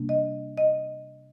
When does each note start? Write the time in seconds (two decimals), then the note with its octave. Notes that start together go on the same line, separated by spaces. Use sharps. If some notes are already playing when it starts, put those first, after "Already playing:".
Already playing: C3 G3 A#3 D4
0.09 D#5
0.57 D#5